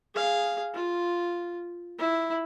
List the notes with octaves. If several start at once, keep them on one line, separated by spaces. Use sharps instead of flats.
G#4 F5
F4
E4